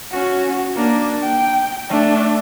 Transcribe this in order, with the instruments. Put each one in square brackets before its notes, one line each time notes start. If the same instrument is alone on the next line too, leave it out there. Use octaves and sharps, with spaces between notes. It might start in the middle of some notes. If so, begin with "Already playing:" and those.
[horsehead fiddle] C#4 F#4
A#3 D4
G5
A3 D4